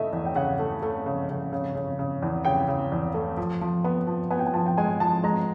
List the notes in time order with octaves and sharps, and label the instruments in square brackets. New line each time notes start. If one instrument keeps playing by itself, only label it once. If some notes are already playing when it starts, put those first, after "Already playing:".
Already playing: [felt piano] C#3 A3 [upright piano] D#5 E5
[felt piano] E2
[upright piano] G5
[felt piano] C#3 [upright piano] F#5
[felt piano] A3
A3
C#3
C#3
C#3
C#3
C#3
E2
[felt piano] C#3 [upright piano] G5
[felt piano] C#3
E2
A3
F3
F3
B3
F3
[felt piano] B3 [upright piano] G#5
[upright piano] G5
G#5
[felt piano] F3 [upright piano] A5
[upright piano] G5
[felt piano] G#3 [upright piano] G#5
[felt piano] F3 [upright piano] A5
[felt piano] G#3 [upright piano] A#5